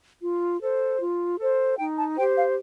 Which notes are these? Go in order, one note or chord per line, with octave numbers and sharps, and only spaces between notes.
F4
A4 C5
F4
A4 C5
D#4 G5
A5
G4 C5 G5
F5